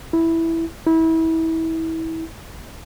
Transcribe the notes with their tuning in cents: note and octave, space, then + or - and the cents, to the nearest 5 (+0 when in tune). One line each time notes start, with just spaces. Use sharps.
E4 +0
E4 -25